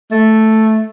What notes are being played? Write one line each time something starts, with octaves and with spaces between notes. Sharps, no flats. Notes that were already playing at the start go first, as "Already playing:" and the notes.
A3